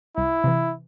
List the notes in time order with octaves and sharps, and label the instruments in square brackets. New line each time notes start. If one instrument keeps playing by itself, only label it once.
[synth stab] C2 [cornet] E4
[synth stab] C3 E3